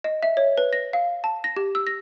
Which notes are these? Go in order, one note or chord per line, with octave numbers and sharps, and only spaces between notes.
D#5
E5
C#5
B4
A#6
F5
A5
A#6
G4
E6
A#6